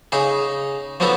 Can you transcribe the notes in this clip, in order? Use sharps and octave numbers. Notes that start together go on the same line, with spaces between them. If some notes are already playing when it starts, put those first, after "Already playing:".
C#3 D#4 G#4
F3 F#3 B3 D#4 A4